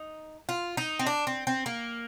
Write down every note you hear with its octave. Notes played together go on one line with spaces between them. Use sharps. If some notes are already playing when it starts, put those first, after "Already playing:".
Already playing: D#4
F4
D#4
C4
D4
C4
C4
A#3